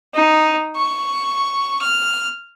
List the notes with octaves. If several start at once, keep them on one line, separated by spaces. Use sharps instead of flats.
D#4
C#6
F6